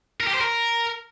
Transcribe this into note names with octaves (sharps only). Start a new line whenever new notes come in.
A#4
G4
C5
A#4